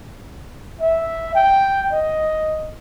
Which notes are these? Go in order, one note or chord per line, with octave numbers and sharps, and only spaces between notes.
E5
G5
D#5